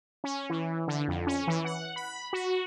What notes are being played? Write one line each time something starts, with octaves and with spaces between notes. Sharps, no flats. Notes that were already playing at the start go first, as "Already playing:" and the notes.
C#4
E3
D3
F2
C#4
E3
F#5
B5
F#4